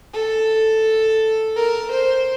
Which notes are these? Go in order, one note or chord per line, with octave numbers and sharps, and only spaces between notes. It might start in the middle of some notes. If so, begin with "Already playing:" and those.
A4
A#4
C5